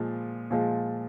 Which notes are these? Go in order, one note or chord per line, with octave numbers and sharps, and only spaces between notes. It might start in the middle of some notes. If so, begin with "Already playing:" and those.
Already playing: A#2 F3 G#3
A#2 F3 G#3